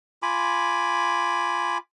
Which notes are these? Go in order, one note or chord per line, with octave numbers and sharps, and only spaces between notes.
F4 G#5 B5 D6